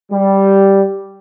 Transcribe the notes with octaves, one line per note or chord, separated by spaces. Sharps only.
G3